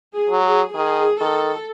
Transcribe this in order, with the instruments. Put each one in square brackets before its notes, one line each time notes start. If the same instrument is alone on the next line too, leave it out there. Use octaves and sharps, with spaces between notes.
[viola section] G#4
[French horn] F#3
[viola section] G#4
[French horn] D#3 [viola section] G#4
[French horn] D#3 [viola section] A4